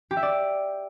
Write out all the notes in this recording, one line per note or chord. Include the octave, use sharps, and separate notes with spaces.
G4
E5
D5